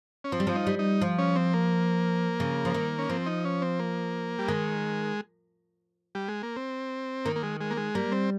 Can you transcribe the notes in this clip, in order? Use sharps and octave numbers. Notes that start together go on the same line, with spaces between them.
C#4
F3 C4
G3
F3
D#4
G3
D#4
F3
C#4
C4
A#3
C#3
F3
D#3
C#4
F3 C4
D#4
C#4
C4
A#3
G3
D#3 G#3
G3
G#3
A#3
C4
D#3 A#3
A#3
G#3
G#3
A#3
G#3
G3 A#3
C4